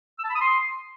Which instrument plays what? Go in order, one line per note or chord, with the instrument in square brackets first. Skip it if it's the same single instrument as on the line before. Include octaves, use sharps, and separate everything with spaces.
[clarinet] E6
A5
B5
D#6
C6